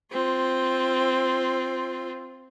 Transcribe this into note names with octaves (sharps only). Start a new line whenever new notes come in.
C4 F4